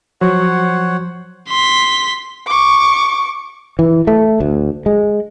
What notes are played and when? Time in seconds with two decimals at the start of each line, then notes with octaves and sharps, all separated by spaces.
0.21 F3 F#3 C5 C#5 F#5
1.48 C6 B6
2.47 C#6 D6
3.79 E3
4.07 A3
4.40 D2
4.86 G#3